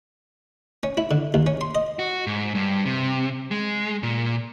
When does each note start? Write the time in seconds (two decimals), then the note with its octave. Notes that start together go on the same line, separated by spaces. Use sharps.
0.83 C#4
0.97 E4
1.11 D3
1.34 D#2
1.47 C#4
1.61 C6
1.75 D#5
1.99 F#4
2.27 G#2
2.55 G2
2.86 C3
3.51 G#3
4.03 A#2